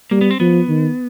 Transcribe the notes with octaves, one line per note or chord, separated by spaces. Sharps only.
G3 A#3
B3
C4
F3 B3
D#3